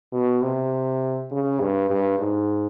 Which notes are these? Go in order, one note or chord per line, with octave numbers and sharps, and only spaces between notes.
B2
C3
C#3
G2
G2
G#2